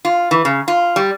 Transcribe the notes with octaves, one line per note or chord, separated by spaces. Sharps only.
F4
E3
C#3
F4
G3